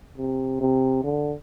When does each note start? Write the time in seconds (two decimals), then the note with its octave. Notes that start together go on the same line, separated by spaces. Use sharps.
0.18 C3
0.61 C3
1.04 D3